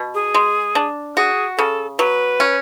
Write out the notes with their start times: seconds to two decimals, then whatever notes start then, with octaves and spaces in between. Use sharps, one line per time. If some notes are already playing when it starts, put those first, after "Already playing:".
Already playing: B2
0.15 G#4
0.34 G#3
0.75 D4
1.17 F#4 G#4
1.57 C#3 A4
1.99 F#3 B4
2.40 C#4